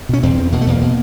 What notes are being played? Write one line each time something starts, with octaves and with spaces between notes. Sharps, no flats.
B2 C#4
E2 C4
E2
B2 A#3
A3
E2 A#3
B2